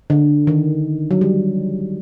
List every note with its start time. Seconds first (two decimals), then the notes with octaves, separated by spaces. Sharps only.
0.10 D3
0.47 D#3
1.11 F#3
1.21 G3